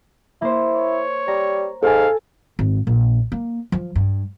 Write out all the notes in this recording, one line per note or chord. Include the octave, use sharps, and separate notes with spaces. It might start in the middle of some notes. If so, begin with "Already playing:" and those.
A#3 E4 C5
C#5
G3 A#5
G#2 A4 F5 G#5
G#1
A#1
A#3
F3
G2